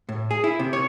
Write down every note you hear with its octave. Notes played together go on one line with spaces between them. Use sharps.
A2
G#4
E4
C3
C#5